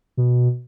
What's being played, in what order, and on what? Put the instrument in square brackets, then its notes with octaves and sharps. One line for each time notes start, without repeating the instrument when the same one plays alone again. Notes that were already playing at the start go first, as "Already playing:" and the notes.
[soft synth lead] B2